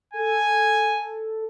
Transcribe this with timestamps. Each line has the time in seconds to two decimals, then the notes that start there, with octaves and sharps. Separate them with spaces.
0.14 A4 G#5